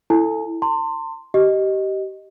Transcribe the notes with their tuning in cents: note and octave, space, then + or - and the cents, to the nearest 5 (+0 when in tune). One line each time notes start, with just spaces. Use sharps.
E4 +0 A4 +5 G#5 +15
A5 +45 C6 +0
G4 -25 D#5 +0